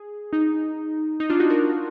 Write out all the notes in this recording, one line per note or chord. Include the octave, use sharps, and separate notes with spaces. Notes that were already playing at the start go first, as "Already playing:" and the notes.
Already playing: G#4
D#4
D#4
D4 F4
D#4 F#4
F#4 A#4